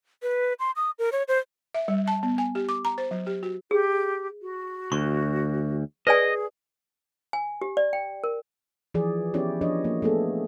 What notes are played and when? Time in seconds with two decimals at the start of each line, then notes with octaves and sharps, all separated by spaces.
0.23 B4
0.60 C6
0.76 D#6
0.99 A#4
1.12 C#5
1.28 C5
1.75 E5
1.88 G3
2.08 A5
2.23 B3
2.38 G#5
2.55 G4
2.69 D6
2.85 A#5
2.98 C5
3.11 F#3
3.27 G4
3.43 F#4
3.71 G4 G#4
4.42 F#4
4.92 D2 C#6
6.07 G#4 B4 D5 D#5 G#5
7.33 G#5
7.61 G4
7.77 D5
7.93 G5
8.24 A#4
8.94 E3 F3 G#4 D5
9.34 B3 C#4 E4 G4 C#5 D5
9.61 F3 D4 C#5 D#5
9.84 A#3
10.02 A3 B3 G#4 A4